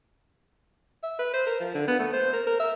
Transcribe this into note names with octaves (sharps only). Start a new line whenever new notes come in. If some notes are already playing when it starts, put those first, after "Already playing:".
E5
B4
C5
A#4
F3
D3
B3
A3
C5
A#4
A#4
E5